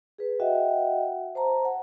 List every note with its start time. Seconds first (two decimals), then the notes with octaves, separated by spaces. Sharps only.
0.18 G#4 B4
0.40 F#4 D#5 E5 F#5 G5
1.35 C5 A5 A#5
1.65 F#5